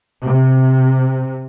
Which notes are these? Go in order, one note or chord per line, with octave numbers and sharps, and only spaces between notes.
C3